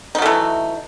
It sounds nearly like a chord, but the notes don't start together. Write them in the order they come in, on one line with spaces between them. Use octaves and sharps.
D#4 F#3 A3 E3